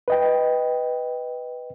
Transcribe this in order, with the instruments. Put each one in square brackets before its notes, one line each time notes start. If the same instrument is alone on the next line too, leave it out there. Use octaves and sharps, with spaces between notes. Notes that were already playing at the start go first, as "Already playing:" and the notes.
[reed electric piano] B4 D#5 G5